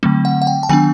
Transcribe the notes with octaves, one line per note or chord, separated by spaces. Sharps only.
D3 F#3 A3 C4
F#5
F#5
G5
A5
D#3 F#3 B3 D4 G#5